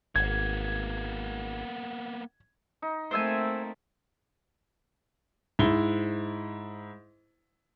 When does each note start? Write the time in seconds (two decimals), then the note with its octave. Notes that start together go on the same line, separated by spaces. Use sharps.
0.16 G#1 A#3 B3 G#6
2.82 D#4
3.11 A3 A#3 C4 C5 E5 G#5
5.59 G#2 E4 G7